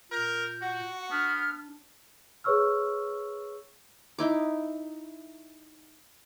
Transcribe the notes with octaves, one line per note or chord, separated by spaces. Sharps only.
A#2 A#4 G6
F#4 F#5
B3 D4 F6
G#4 B4 C#5 C#6 E6 F6
D#4 E4 D6